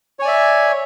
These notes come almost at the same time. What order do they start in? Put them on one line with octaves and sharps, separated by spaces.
C#5 G#5 D5 E5